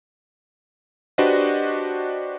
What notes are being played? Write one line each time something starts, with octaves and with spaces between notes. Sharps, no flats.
D4 F#4 G4 B4 C5 D#5